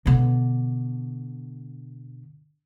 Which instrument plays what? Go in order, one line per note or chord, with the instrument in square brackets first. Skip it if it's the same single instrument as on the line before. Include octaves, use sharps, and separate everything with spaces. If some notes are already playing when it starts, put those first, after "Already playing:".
[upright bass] B2 D3